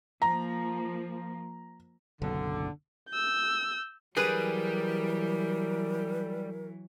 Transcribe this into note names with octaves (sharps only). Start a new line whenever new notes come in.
F3 A#3 A#5
F#1 B1 D3
E6 G6
E3 F#3 G3 G#4 A#4 B4